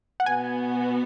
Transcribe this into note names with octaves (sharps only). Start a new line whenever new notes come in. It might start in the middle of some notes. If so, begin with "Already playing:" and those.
F#5
B2 B3 F#4 G#5